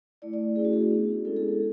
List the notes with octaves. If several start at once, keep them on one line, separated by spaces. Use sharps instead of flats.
A3 E4 D5
D5
A3 C#4 E4 G#4
F#4
G#4
B3 D4 F#4
G#3 C#4 E4 A4
G#4
A4